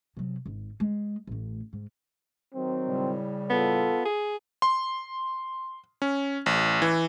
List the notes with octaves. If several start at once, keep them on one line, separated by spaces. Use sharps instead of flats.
C3 F#3
G#1
G#3
A1 A2
G#2
D#3 F#3 C4
A2 C#3 G3
B3 F4 A4
G#4
C6
C#4
A1
E3